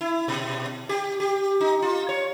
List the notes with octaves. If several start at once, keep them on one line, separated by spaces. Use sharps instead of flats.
E4
B2
G4
G4
D#4
F4
C#5